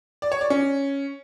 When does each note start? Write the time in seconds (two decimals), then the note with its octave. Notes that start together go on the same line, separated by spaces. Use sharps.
0.22 D5
0.32 C#5
0.41 D5
0.50 C#4